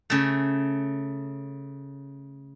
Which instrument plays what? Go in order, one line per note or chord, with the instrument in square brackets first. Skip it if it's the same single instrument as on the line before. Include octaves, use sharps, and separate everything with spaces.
[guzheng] C#3 A3